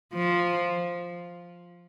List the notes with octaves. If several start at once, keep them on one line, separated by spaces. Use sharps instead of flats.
F3